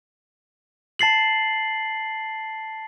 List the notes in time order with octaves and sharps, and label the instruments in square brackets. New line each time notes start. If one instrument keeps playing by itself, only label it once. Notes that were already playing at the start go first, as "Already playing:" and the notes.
[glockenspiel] A5 A6 C7 F#7